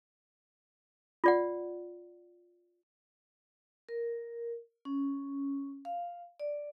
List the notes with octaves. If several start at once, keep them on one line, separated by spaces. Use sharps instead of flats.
F4 D5 F#5
A#4
C#4
F5
D5